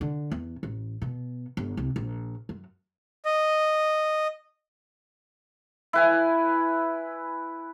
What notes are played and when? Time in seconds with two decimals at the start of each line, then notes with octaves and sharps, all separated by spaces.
0.01 D3
0.32 E2
0.63 A1
1.02 B2
1.57 G1
1.77 C2
1.96 A#1
2.49 F#2
3.25 D#5
5.93 E4 B4 G#5